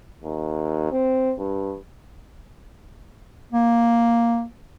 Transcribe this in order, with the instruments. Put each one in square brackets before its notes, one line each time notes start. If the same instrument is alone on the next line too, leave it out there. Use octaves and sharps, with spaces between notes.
[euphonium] D#2
C4
G2
[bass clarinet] A#3